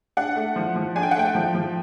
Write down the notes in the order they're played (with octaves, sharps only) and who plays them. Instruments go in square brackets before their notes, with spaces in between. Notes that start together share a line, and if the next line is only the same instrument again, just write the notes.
[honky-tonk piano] D4 F#5
A3
F3
F3
D4 G#5
G5
F#5
A3 G5
F3
F3